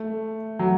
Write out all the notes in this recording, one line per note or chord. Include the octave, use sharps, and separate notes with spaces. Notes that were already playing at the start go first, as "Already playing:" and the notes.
Already playing: A3
F#3